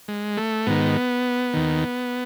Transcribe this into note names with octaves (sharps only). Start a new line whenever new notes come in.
G#3
A3
G#2 D#3 B3
D#2 D#3